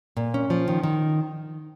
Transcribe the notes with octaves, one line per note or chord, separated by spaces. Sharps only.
A#2
C#4
F3
D#3
D#3